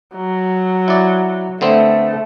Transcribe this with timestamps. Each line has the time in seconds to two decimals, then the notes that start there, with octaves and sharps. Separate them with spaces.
0.16 F#3
0.88 E4 D5
1.61 D3 A3 B3 C4